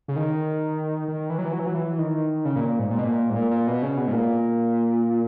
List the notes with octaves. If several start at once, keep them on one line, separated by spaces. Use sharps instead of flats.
C#3
D#3
D#3
E3
F#3
E3
F#3
E3
F#3
E3
D#3
C#3
A#2
A#2
G#2
A#2
B2
A#2
G#2
A#2
A#2
B2
C#3
B2
G#2
A#2